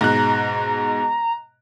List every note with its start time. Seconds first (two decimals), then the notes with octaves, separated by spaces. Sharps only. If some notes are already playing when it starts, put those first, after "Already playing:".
0.01 G#2 B2 A#5 F#6